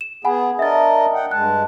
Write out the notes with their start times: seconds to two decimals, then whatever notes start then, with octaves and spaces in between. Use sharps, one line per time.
0.01 E7
0.25 B3 G#4 F#5 G#5 B5
0.59 D4 A#4 D#5 E5 A6
1.13 F#5 G5
1.31 G2 G#3 A5 F#6